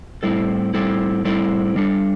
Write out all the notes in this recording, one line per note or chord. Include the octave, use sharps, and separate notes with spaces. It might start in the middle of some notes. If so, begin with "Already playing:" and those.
A2 G3 C4 E4 A4
A2 G3 C4 E4 A4
A2 G3 C4 E4 A4
G3 D4 A4